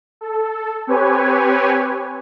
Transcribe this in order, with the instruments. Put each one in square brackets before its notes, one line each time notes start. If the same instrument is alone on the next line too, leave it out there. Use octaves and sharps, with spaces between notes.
[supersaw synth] A4
C4 G4 B4 C#5 G#5